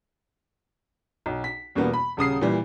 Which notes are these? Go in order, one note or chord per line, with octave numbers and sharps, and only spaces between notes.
B1
B6
E2 B2 G3 A#3 B3
B5
D#1 C#3 D#6 C7
A#2 E3 G3